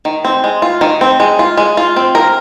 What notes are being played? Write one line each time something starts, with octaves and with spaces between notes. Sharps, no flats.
D#3
C4
G#3
F4
D#3
C4
G#3
F4
G#3
F4
C4
A#4